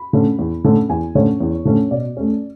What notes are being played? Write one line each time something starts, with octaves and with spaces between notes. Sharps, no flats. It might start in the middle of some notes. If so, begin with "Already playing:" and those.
Already playing: B5
D3 A3 C#4
E2
D3 A3 C#4
E2 G#5
D3 A3 C#4 C#5
E2
D3 A3 C#4
B2 D5
A3 C#4